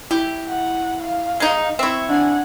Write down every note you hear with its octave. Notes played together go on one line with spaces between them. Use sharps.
E4 G4
F#5
F5
G#3 D#4
C4 E4 E5 C#6
D4 F#5 G#5